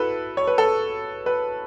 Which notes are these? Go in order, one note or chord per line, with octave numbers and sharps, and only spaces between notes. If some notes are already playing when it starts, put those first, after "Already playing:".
Already playing: E4 F#4 A4 B4
C#5
B4
A4
B4